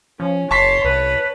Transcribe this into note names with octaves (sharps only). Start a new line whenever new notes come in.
F3 C#4
F#1 C#5 A5 C6 C#6 B6
C2 B4